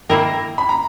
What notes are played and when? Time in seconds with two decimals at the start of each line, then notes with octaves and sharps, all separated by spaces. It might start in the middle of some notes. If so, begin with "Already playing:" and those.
0.09 A#3 E4 A#4 G5
0.58 B5
0.69 A#5